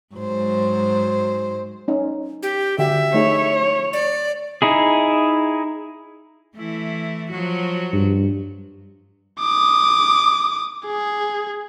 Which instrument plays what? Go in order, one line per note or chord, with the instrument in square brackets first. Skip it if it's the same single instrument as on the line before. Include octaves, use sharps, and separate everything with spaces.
[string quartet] G#2 F#3 C5
[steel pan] C#4 D#4
[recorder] G4
[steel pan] D3 F#4 G4 [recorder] E5
[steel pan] A3 D#4 G#4 [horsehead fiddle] C#5
[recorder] D5
[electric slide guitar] D#4 E4 G#4
[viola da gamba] E3 A3 E4
F3 F#3 F#4
[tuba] G2
[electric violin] D6 D#6
G#4